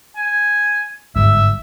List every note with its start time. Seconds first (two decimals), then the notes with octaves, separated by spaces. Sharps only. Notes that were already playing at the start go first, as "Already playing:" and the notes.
0.17 G#5
1.16 G1 G#2 E5